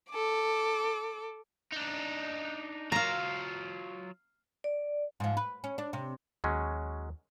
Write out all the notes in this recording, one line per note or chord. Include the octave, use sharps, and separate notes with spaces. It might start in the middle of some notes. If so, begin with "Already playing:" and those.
A4 D6
D4 D#4
F#3 F4 F5 A#5
D5
G#2 F3
B4
C#4
D4
C3
D#2 F#3 G#3 C#4